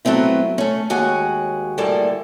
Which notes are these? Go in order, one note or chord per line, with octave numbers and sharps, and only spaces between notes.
F#3 A3 B3 C4 E4
A3 C#4
D#2 G#3 F#4 F#5 G#5
D2 A2 G3 G#3 A#3 A4